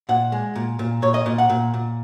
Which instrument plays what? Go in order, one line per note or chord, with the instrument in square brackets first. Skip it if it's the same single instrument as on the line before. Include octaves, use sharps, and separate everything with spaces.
[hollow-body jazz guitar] A#2 F#5
G#3
A#2
A#2
A#2 C#5
D#5
A#2
F#5
A#2
A#2